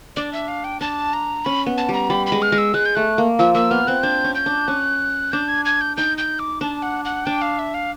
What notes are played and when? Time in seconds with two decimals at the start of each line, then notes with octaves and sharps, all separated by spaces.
0.16 D4 D5
0.33 E5
0.48 F5
0.64 G5
0.80 D4 A5
1.13 A#5
1.45 C#4 B5
1.66 B3
1.78 A5
1.89 G3 A#5
2.10 G3 B5
2.27 B5
2.32 G#3
2.42 F6
2.52 G#3
2.58 E6
2.74 G#3 F#6
2.86 G6
2.95 A3 F#6
3.18 A#3
3.39 F3 E6
3.54 A#3 E6
3.71 B3 F6
3.87 C4 F#6
4.03 D4 G6
4.24 C#4
4.35 G6
4.46 D4
4.68 C#4 F#6
5.32 D4 G6
5.48 G#6
5.65 G#6
5.81 G6
5.97 D#4 G6
6.18 G6
6.39 D6
6.61 D4 A5
6.82 F#5
7.05 F#5
7.26 D4 G5
7.42 F5
7.59 E5
7.74 F5